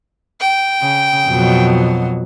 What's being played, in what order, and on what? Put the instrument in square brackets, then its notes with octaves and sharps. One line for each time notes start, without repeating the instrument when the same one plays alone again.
[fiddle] G5
[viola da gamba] C#3
F2 B2 F#3